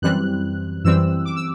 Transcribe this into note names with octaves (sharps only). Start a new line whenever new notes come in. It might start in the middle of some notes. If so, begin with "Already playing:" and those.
F#2 E3 G3 C4 F#6
F#2 E3 G3 C4 E6
D6
E6